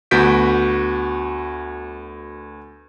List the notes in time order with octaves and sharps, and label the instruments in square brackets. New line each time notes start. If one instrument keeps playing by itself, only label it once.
[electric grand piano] D2 B3 F#4 G6 B6 D7